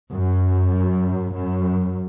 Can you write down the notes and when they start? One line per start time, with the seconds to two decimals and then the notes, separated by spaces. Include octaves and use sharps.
0.12 F#2
1.36 F#2